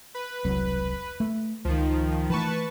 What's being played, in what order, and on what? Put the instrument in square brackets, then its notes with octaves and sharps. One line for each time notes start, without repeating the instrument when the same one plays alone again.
[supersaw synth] B4
[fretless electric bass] E1 C2 F#3
A3
[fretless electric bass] C#2 [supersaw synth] D#3 F3
[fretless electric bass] E3 A3 [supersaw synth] B4 A5 C#6